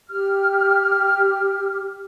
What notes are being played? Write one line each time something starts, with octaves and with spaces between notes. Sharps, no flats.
G4 F6